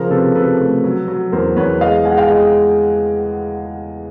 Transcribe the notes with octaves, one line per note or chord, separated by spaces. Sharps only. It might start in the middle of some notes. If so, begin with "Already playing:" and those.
Already playing: C#3 F3 G#4 A#4
C3 A4 B4
C3 A4 B4
A3
F#3
F#3
E2 A#4 C5
E2 B4 C#5
G#3 D#5 F5
G#3 F#5 G#5
F5 G5
G#3 D#5 F5